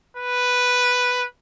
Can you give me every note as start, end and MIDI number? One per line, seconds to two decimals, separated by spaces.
0.17 1.25 71